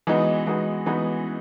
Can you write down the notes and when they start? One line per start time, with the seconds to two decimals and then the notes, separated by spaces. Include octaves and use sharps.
0.07 E3 G#3 B3 D#4 F#4
0.47 E3 G#3 B3 D#4 F#4
0.86 E3 G#3 B3 D#4 F#4